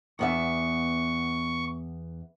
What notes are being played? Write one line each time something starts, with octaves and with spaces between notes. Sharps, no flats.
E2 B3 E5 C#6